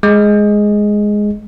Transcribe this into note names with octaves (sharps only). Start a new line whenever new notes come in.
G#3